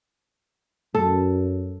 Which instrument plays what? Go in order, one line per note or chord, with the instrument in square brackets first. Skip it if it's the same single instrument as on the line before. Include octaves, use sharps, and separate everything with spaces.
[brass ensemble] F#2 [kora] A4